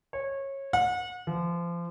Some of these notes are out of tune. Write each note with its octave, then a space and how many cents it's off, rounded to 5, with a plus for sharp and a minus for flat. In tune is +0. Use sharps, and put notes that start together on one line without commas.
C#5 -20
F#5 -35
F3 -30